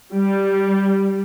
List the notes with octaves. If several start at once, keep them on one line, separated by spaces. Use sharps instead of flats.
G3